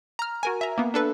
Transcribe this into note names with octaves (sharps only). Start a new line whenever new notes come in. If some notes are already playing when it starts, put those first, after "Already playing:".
A#5 F6
F#4 A#4 G#5
E5 A#5
A#3 B3
D4 A4 B4